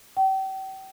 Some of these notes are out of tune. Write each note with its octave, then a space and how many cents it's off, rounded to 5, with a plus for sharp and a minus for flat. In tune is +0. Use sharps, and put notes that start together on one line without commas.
G5 -35